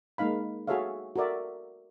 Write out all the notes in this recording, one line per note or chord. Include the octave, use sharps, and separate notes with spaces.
G#3 A#3 D#4 F5 B5
F#4 G#4 A4 C#5 E5 F5
F#4 A4 A#4 D5 E5